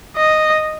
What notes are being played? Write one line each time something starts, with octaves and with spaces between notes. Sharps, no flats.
D#5